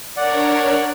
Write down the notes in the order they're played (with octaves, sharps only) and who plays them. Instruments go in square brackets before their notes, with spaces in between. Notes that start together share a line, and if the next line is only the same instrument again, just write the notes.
[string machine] D4 A#4 C#5 [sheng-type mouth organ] D5 F#5